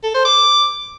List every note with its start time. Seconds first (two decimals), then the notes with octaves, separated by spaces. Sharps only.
0.03 A4
0.14 C5
0.25 D6